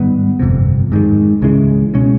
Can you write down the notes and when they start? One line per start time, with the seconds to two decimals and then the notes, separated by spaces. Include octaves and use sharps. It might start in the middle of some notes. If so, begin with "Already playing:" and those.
Already playing: G#2 D#3 G3 B3
0.40 G1 F2 C3
0.92 G#2 D#3 G#3
1.42 C#2 C#3 E3 G#3
1.94 B2 G#3 C#4